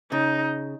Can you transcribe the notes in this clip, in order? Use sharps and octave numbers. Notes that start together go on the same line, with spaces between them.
C#3 D#4